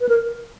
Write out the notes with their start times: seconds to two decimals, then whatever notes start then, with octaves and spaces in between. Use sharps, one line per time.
0.01 B4
0.09 A#4